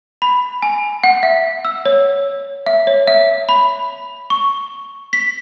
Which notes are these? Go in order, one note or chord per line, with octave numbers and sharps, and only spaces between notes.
B5
G#5
F#5
E5
E6
C#5
E5
C#5
E5
B5
C#6
B6